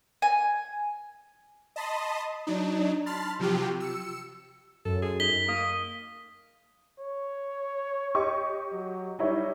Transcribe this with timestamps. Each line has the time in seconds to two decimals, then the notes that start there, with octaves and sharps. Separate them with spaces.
0.22 G#5
1.76 D#5 A5 B5 C6 D#6
2.47 F#3 D4 D#4
3.06 A5 B5 C6 F6 A6
3.39 C3 F3 F#3 F4 G4
3.80 E6 C#7
4.85 F#2 A4
5.02 G#4
5.20 D#4 B6 G7
5.48 A#3 D#6
7.00 C#5
8.15 G4 D#5 C#6
8.72 F#3
9.19 G3 D#4 E4 C#5